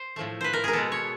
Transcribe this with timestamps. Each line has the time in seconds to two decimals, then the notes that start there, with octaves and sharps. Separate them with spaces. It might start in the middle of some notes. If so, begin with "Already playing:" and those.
Already playing: C5
0.16 A2 F3 A3
0.41 B4 C5
0.53 A#4
0.64 G#4 A#4
0.73 B2 G#3 B3 A4
0.92 C#5